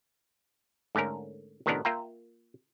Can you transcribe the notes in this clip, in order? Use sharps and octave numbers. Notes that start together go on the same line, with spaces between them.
G#2 D3 A3 C#4 A#4
A2 C3 D#3 B3 D4 A#4
A#3 F4 E5 G5 A#5